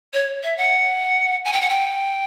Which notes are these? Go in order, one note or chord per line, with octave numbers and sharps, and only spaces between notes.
C#5
E5
F#5
G#5
G5
F#5
G5